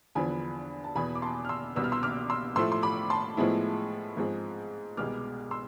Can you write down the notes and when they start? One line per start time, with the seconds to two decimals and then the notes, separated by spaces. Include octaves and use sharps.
0.15 E2 D3 F3 B3 G#5 B5
0.84 A5
0.95 E2 B2 B3 G#5 B5
1.15 D6
1.22 A5 C6
1.45 F6
1.49 C6 E6
1.76 C2 B2 B3 E6
1.84 F6
1.92 C6 E6
2.03 D6 F6
2.30 C6 E6
2.56 A2 F3 A3 C6 E6
2.72 C6
2.83 B5 D6
3.10 A5 C6
3.37 A2 F3 G#3 B3 E4
4.17 G#2 F3 G#3 C4
4.97 C2 B2 G#3 B3 D6 F6
5.51 C6 E6